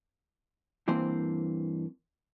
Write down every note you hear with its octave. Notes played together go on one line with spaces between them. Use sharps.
G2 E3 A#3 C4 C5